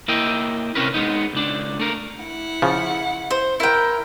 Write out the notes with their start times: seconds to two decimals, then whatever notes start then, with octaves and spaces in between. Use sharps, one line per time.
0.08 A#3 E4 D#5 G5
0.75 C3 E3 C4 C#4 A#4 B4
0.94 G#3 B3 D#4
1.33 C#2 D4
1.80 A3 A#4
2.21 E4 F#5
2.62 C#3 F3
3.30 C5
3.60 E4 A#4 G5